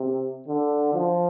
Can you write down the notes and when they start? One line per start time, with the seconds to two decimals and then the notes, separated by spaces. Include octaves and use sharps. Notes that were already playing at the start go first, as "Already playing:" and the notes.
Already playing: C3
0.48 D3
0.94 F3